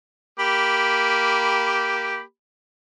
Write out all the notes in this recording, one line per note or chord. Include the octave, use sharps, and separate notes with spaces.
A#3 G4 B5